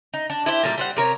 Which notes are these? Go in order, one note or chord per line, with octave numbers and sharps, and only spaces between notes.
D#4
D4
E4 G4 C5
A#2 G3
G3 C4 F#5
C3 A#4 C#5